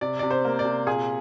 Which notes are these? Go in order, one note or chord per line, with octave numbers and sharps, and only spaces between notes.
C3 D5
C3 D5
C5
A#3
D5
C3
A#2 G#4